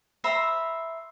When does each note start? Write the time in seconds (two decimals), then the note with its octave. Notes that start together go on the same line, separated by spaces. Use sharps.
0.24 C5 E5 A#5 B5